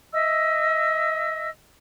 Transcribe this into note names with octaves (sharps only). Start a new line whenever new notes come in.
D#5 E5 E6